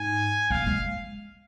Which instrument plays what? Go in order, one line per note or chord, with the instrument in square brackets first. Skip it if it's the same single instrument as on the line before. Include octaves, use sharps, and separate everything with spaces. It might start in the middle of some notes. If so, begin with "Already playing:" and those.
Already playing: [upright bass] G#2 [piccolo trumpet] G#5
[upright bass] A#3 [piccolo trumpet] F5
[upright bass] G#3